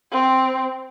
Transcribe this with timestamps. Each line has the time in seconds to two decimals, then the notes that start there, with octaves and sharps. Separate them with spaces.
0.12 C4